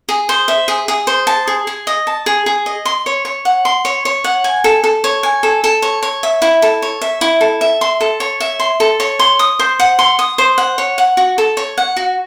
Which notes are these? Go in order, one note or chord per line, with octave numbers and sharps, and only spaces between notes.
G#4
C5
E5
G#4
G#4
C5
A5
G#4
G#4
D#5
A5
G#4
G#4
D#5
C6
C#5
C#5
F#5
C6
C#5
C#5
F#5
G#5
A4
A4
C#5
G#5
A4
A4
C#5
C#5
E5
E4
A4
C#5
E5
E4
A4
E5
C6
A4
C#5
E5
C6
A4
C#5
C6
D#6
C5
F#5
C6
D#6
C5
F#5
C#5
F#5
F#4
A4
C#5
F#5
F#4